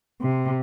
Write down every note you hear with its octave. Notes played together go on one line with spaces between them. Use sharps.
C3